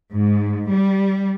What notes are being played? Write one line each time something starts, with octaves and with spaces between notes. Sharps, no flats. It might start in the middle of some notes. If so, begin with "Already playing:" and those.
G#2
G3